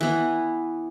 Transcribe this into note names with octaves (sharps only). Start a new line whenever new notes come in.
E3 B3